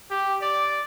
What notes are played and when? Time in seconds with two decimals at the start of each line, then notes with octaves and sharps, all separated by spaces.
0.10 G4
0.42 D5